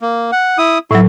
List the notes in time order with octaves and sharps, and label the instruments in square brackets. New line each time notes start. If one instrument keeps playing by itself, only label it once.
[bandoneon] A#3
F#5
E4 D#6
[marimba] A2 F#3 [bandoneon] E4